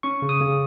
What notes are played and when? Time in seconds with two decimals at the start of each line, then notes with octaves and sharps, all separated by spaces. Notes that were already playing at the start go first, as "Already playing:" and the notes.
0.03 C#4 C#6
0.22 C#3
0.29 D#6
0.41 C#3